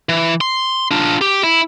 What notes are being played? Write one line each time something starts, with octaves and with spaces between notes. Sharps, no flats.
E3
C6
D4 F4
G4
E4